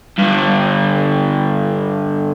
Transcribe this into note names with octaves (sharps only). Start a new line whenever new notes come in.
G2 D3